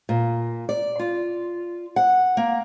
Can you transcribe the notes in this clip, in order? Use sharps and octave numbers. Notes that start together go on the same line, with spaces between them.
A#2
D5
F4
F#5
A#3